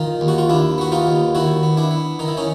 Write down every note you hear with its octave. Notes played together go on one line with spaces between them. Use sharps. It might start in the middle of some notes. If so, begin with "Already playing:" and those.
Already playing: D#3 D#4 F4
D#2
F#4
F4
D#2 D4 E4
B3 F#4
D#4 F4
D#2
D#3 E4 F#4
B3
D4 E4
B3
D#3 D#4
E4
C#4 D#4